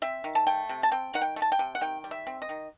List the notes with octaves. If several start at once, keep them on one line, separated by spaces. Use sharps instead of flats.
C4 E5
D#3
A5
A3 G5
C3
A5
C4 G5
D#3 F#5
G5
A3
A5
G5
C3
F#5
D#3 G5
G3
E5
C4
D#5
D#3